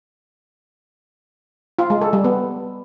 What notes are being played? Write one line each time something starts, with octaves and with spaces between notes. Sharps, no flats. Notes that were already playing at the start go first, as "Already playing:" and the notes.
F4
G#3
A4
G3
B3